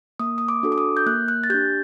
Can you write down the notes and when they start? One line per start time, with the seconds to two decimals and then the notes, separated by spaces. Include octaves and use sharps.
0.19 A#3 D#6
0.38 D#6
0.48 D6
0.63 D4 F#4 A4
0.72 D6
0.78 D#6
0.97 G6
1.06 A#3 F#6
1.28 F#6
1.44 A6
1.50 D4 G4 G6